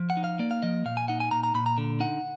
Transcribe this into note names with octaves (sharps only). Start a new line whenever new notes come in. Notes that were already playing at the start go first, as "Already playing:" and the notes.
Already playing: F3
F#5
D#4
F5
A#3 D5
F5
F3 D#5
A#2 F5
G#5
D#4 F#5
G#5
A#2 A#5
A#5
A#2 B5
A#5
D3
D#4 F#5